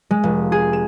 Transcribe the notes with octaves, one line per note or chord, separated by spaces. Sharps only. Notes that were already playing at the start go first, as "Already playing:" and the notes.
G#3
F1
G#4
E7